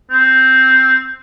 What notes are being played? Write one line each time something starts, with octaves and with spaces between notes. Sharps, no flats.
C4